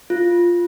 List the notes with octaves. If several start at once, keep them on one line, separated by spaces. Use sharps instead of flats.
F4